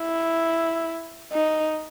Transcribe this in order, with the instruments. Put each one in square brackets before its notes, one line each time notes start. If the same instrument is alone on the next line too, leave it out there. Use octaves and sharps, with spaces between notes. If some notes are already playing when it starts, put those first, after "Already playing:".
Already playing: [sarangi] E4
D#4